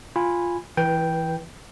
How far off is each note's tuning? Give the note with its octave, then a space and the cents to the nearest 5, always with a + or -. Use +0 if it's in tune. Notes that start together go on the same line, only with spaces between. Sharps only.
F4 +0 G#5 -15 B5 +0
E3 +0 B4 -25 G5 +0